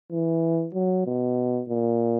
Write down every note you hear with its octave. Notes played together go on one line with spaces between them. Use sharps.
E3
F#3
B2
A#2